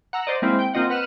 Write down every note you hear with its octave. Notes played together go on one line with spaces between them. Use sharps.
F#5 A#5 E6
C5 D5 D#5
G#3 A#3 C4 E4
G5
A#3 C4 F4 D#5 F#5
B4 F#5 F6 D#7 E7